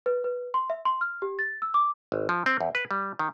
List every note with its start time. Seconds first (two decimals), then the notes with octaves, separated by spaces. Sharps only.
0.06 B4
0.24 B4
0.54 C6
0.70 E5
0.85 C6
1.01 F6
1.22 G4
1.39 A6
1.62 E6
1.74 D6
2.12 G#1
2.29 F3
2.46 C4
2.61 E2
2.75 B4
2.91 G3
3.19 D#3